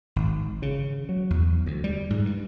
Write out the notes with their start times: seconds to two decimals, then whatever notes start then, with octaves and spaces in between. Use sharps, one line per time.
0.16 G#1
0.62 C#3
1.09 F#3
1.30 E2
1.66 D2
1.84 G3
2.10 G#2
2.25 G2